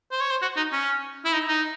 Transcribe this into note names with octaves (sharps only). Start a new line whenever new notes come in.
C5
C#5
C5
F#4
D#4
C#4
E4
D#4
D#4